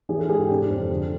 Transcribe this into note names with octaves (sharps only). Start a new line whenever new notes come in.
E3 G#4
A4
G#2 G#4
G4
C3 D4
F2
D3